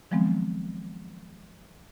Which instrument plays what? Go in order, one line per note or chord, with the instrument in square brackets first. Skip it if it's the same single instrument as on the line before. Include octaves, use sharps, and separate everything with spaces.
[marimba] D#3 F3 F#3 G#3 B3 C4